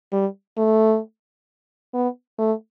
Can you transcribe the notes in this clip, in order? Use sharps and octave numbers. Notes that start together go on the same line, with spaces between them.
G3
A3
B3
A3